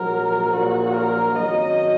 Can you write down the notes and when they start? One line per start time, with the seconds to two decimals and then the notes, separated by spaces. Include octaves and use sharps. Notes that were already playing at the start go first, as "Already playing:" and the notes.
Already playing: A#1 G#2 F#3 A#4
0.52 A#1 A#2 F#3 A#3 F#4
0.94 A#4
1.35 G#1 F#2 F#3 D#5